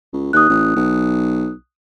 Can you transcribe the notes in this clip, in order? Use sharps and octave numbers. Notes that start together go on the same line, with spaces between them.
C#2
D#2 D#6 F#6
A1
B1